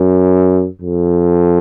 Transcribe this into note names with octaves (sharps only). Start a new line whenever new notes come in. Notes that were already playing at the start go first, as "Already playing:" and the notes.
Already playing: F#2
F2